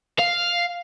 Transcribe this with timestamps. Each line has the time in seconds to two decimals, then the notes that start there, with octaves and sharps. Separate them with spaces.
0.19 F5